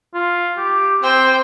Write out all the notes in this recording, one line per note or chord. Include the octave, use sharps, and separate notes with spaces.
F4
G4
C4 C5 G5